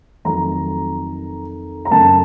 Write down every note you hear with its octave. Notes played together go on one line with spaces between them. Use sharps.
F2 D#3 F#3 A3 A#5
A#5
F#2 C#3 A3 A5